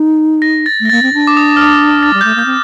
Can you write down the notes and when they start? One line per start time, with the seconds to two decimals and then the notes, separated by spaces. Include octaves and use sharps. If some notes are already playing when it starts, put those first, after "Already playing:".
Already playing: D#4
0.42 A#6
0.66 A6
0.80 A3 A#6
0.90 A#3 A6
1.02 C4
1.14 D4
1.27 D6
1.37 D#6
1.57 F6
1.61 D#6
2.03 A6
2.14 G3
2.21 A3 G6
2.36 A#3 G6
2.46 C4